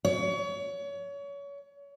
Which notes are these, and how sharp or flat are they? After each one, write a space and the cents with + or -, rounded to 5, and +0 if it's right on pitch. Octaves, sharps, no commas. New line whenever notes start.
C#5 +30